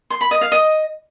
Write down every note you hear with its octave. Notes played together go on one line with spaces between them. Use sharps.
C6
B5
D#5
F5
D#5